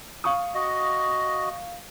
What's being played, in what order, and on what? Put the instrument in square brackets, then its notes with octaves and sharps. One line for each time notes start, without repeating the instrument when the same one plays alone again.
[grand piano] F5 C#6 D#6
[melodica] F#4 D#5